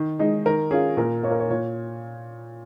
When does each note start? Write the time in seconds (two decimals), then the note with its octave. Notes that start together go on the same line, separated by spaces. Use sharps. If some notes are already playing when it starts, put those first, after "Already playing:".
Already playing: D#3
0.19 G#3 D#4
0.45 D#3 A#4
0.71 C#4 F4 G#4
0.97 A#2 A#4
1.23 A#3 C#5
1.28 F4 A#4
1.39 C#5
1.50 A#2 C#5